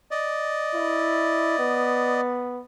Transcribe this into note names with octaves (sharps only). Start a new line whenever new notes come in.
D5 D#5
E4
B3